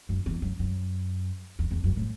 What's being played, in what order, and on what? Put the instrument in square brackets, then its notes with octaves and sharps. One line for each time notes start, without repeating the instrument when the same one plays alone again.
[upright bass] F#2
E2
F#2
F#2
E2
E2
F#2
A2